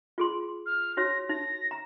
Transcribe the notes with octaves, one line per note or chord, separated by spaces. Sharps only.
F4 G#4 C6
F6
D#4 F#4 C#5 A#6
D#4 A#6
A#5